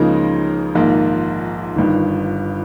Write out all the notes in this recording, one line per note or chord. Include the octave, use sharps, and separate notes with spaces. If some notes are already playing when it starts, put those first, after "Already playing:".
Already playing: C#2 C#3 F3 A#3 D#4
A#1 G#2 D#3 A#3
G1 G2 D#3